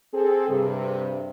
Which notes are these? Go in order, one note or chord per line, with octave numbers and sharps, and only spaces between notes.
C4 G#4 A4
G2 C3